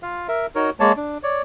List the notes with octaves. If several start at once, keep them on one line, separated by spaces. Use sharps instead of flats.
F4 F5
A#4 E5
D#4 F#4 A#4 C#5
G#3 A#3 C#5 A5
D4
C#5 D5